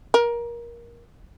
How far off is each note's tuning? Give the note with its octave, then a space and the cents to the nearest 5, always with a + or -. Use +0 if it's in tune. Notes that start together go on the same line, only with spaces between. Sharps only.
A#4 +20